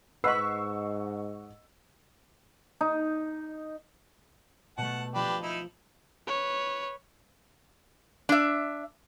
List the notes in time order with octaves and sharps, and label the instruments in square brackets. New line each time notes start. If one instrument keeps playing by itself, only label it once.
[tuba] G#2 [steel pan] B4 B5 [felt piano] D#5 F#5 C7 [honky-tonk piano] C#6 E6
[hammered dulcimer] D#4
[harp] B2 A3 [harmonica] F#5 A5
[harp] F3 [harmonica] D4 G4 B4
[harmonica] D#4 E4
[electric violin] B4 C#5
[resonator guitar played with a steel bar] D4 E5